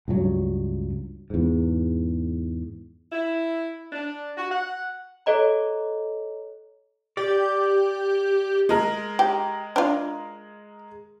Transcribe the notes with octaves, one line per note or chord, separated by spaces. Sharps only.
C#2 G2 F#3
E2 G#2
E4
D4
F#4
F#5
A4 C#5 D#5 A#5
G4 D5
G#3 A#4
G4
D4 F4